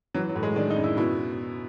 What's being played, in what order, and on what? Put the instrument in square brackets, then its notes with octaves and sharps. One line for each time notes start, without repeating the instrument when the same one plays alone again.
[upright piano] E3 [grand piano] F#3
[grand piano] F#3
[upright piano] A2
[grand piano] G#3
[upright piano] D#3 [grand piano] D4
[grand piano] D#4
[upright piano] F#2
[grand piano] E4
[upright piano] B2 [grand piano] E4